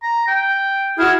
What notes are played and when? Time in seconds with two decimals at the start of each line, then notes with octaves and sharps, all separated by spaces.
0.03 A#5
0.28 G5
0.98 E4 F#4 G#4 F6